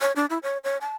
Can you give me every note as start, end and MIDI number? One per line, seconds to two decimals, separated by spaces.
0.01 0.12 73
0.16 0.26 62
0.30 0.38 64
0.43 0.58 73
0.64 0.77 73
0.81 0.96 81